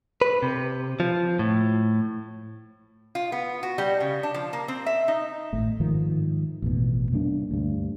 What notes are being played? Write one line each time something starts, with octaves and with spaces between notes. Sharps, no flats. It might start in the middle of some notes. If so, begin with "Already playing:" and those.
B4
C3
F3
A2
F4
B3
F#4
G3
C#3
D4
F3
A#3
C4
E5
D#4
G#1 A2
G#2 D#3 F3
A1 F2 B2
C3 G3 A#3 D4
D2 G2